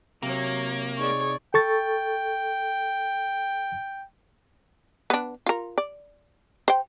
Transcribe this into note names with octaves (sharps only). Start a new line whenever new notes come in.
C3 F#3 A#3 C#5
D#4 G#4 C#5 D5
A4 G5 C#6 A6
B3 D4
F4 A#4
D5
C5 G5